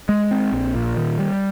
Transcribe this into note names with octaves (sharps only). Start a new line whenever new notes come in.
G#3
C4
A#1
A#2
D#3
G3